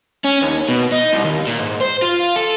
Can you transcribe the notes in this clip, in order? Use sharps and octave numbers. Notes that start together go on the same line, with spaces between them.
C#4
D#2
B2
D#4
C2
D#2
A#2
G#2
C5
F4
A4